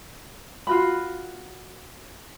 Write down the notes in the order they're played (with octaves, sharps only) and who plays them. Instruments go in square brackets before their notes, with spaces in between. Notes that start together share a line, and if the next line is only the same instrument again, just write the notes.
[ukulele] F4 F#4 B5